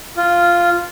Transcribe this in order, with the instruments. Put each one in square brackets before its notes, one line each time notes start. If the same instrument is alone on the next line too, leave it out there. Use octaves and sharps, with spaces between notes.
[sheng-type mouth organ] F4